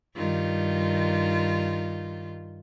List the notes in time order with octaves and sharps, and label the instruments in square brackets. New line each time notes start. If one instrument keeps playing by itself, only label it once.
[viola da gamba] G2 D#3 F4